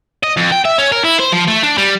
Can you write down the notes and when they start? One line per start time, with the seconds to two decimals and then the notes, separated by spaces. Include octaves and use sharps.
0.23 D#5
0.37 F2
0.51 G5
0.65 E5
0.78 C#4
0.92 A#4
1.05 E4
1.20 C5
1.33 F3
1.48 A3
1.63 D4
1.78 G3